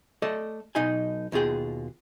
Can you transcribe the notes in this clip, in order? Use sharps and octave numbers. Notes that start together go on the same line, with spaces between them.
A3 A4 D5 D#5
B1 B2 D#4 D#5 G#5
D#2 B2 F4 G#4 G5